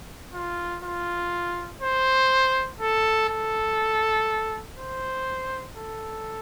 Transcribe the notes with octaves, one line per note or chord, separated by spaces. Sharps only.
F4
F4
C5
A4
A4
C5
A4